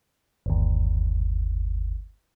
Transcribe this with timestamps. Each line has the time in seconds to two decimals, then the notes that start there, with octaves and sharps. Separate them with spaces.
0.46 G1 D#2